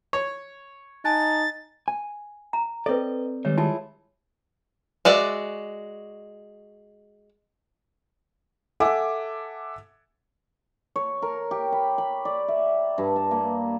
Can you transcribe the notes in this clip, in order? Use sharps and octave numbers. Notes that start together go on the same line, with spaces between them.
C#5
D#4 G#5 A5 F#6 A6
G#5
A#5
C4 A4 B4 D5 D#5
D#3 G3 G#3 C#5
E4 F4 G#4 A5
G#3 F#4 D5 E5
A4 E5 F#5 G#5 D6
C#5
A#4
G4
B5
B5
D5
E5
G2
A5
A#3